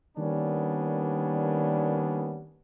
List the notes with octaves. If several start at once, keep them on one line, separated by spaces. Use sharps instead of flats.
D#3 G3 A#3 B3 C#4 D4